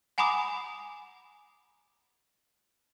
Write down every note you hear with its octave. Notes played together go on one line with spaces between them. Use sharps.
F#5 G#5 A#5 B5 D6 D#6